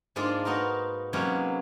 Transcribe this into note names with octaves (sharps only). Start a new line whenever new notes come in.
G#2 G#3 A#3 D4 F4
B3 D#4 F#4 A#4
C3 F#3 G#3 A#3 B3 C#4